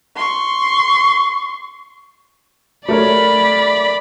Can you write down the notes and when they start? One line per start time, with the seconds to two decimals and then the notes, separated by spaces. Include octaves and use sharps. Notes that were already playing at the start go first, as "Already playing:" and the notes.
0.16 C6 C#6
2.89 A3 A#4 C#5 D5 B5